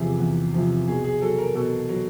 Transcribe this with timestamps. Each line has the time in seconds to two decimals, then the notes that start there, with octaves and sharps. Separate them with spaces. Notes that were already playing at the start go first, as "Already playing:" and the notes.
Already playing: E2 C3 F3 G4 G#4
0.20 E2
0.54 C3 F3
0.88 B2 G#4
1.04 G#4
1.21 F#3 A4
1.38 A#4
1.55 B2 A4
1.89 F#3